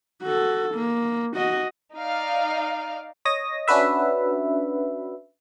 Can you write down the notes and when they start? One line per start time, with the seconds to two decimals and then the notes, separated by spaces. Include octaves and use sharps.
0.23 F#4 A4
0.75 A#3
1.36 F#4 D#5
1.98 D#4 D5 F5
3.25 C#5 D#5 D#6 A#6
3.68 C#4 D4 F#4 B4 E5